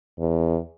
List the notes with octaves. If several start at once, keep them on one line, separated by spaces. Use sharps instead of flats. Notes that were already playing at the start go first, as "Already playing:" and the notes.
E2